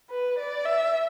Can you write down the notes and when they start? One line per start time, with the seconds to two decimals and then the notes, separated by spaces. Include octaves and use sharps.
0.11 B4
0.39 D5
0.66 E5